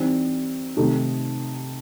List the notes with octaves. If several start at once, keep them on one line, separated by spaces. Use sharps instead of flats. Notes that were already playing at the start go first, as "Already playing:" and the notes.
Already playing: E3 G3 C4 D#4
C3 D#3 A3 D#4